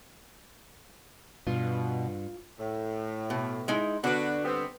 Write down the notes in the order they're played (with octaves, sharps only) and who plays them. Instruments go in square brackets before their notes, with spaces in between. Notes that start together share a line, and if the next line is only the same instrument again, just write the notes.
[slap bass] G2 [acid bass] B2 [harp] F4
[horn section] A2
[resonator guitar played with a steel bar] B2
G#3 D#4 E4
[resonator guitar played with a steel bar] D3 B4 [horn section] B3 D4 F#4
[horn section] G3 B3 C4